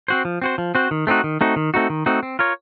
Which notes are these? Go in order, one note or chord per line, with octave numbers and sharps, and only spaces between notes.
C4 F#4 C5
F3
C4 F#4 C5
F3
C4 F#4 C5
D#3
A3 C4 D#4 F#4
D#3
A3 C4 D#4 F#4
D#3
A3 C4 D#4 F#4
D#3
A3 C4 D#4 F#4
C4
F4 A#4 C#5